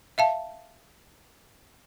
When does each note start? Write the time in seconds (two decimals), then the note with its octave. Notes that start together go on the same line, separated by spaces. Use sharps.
0.18 E5 F5 A5